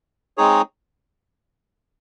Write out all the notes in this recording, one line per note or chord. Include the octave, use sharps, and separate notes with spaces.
G#3 C4 D#4 G#4 C#5